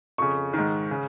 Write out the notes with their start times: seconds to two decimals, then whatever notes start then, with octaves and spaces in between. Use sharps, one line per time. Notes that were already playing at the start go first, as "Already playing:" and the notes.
0.18 F2 C#3 C#6
0.53 G#2 D#3
0.91 C#3